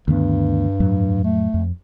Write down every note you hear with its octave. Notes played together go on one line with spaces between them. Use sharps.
D2 G2 D#3 B3
F2 A2 F#3
A3
F2